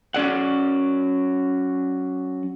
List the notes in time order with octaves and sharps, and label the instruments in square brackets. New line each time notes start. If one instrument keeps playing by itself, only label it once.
[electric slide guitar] F#3 C#4 D5 F#5